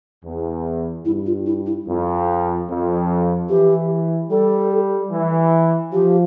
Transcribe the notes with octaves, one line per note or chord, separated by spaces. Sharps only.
E2
G2 E4
F4
E4
E4
F2
F2
E3 G4
G3 A4
E3
F3 G4